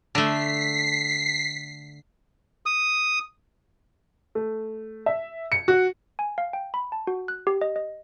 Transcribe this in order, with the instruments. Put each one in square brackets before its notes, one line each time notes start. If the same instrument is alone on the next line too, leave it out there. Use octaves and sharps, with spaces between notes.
[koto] D3 A3 [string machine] B6 C7
[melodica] D#6
[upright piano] A3
E5
C#7
F#4
[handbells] G#5
F5
G5
B5
A5
F#4
F#6
G4
D#5
D#5